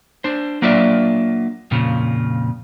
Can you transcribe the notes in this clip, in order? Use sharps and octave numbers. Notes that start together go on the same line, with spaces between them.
D4 C5
F#3 A#3 D4 F4 D5 E5
F2 A#2 C#3 F3